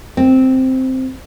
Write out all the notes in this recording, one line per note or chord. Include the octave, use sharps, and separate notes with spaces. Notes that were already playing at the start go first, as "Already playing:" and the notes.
C4